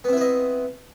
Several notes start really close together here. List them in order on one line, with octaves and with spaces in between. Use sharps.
B3 C4 E4 B4 D#5